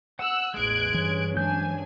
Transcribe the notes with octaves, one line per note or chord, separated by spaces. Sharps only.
F#5 E6 F#6
A1 E2 G#3 F#6 G#6 D7
G2 E3 C#4
E3 F#3 G#3 D4 G#5 G6